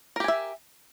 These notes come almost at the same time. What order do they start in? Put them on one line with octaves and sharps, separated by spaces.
A#4 G4 G#5 E5